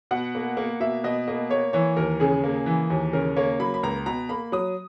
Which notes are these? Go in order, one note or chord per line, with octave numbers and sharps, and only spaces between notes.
B2 F#5
A#3
A#3
B2 E5
B2 D#5
A#3 D#5
A#3 C#5
E3 C#5
D#2 A#4
C#3 G#4
A#3
E3
D#2
C#3 A#4
A#3 C#5
F#3 B5
B5
C#2 A#5
B2 A#5
A#3 B5
F#3 D#6